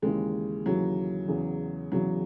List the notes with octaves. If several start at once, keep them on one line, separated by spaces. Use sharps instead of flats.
D#2 C#3 E3 G#3
D#2 C#3 E3 F#3
E2 C#3 E3
E2 C#3 E3 F#3